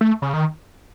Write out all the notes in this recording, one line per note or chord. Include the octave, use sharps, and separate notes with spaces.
A3
C#3
D#3